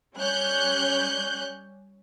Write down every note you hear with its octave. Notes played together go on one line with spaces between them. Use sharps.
G3 C#4 C#5 F#6 G6